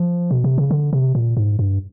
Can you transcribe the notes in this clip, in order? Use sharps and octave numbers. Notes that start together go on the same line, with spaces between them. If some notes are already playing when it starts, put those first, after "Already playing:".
Already playing: F3
B2
C3
C#3
D3
C3
A#2
G#2
G2